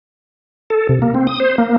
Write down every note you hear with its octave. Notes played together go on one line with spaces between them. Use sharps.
A4
C3
A#3
C4
D#6
C5
A#3